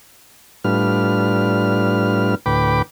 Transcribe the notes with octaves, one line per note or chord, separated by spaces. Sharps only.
A2 G3 D4 F4 B4 F6
D2 A2 B4 G5 B5 D6